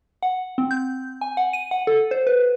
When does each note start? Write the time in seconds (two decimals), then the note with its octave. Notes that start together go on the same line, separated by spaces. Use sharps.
0.23 F#5
0.58 C4
0.71 G6
1.21 G#5
1.37 F#5
1.53 D#7
1.71 F#5
1.87 A4
2.11 C5
2.27 B4